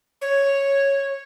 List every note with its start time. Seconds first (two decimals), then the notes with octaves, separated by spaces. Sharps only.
0.22 C#5